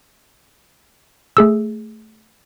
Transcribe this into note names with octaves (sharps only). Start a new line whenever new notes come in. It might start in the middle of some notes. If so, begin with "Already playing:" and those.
A3 G#4 E6